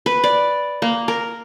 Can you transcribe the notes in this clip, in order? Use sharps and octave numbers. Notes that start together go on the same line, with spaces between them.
B4
D5
A#3
A#4